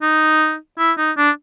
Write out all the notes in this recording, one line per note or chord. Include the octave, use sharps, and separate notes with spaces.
D#4
E4
D#4
D4